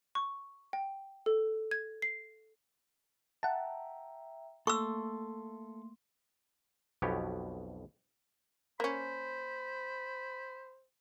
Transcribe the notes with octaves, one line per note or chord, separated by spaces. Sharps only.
C#6
G5
A4
G#6
C7
E5 F#5 G5 A5 A#5
A3 A#3 A4 C6 C#6 E6
B1 F2 B2 B3 G4 C#5
A#3 C#4 C5 B5